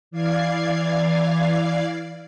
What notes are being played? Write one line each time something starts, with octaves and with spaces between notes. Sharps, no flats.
E3 D5 F5 G#6 C7